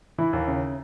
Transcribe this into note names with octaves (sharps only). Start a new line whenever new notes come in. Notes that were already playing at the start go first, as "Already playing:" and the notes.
E3 E4
D#2
C#3